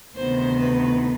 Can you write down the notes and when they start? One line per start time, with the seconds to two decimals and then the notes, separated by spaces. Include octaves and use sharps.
0.16 D2 C3 D#3 B3 C5
0.59 B4